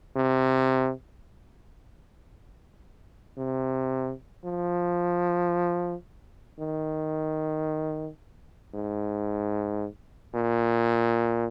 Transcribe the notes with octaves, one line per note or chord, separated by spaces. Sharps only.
C3
C3
F3
D#3
G#2
A#2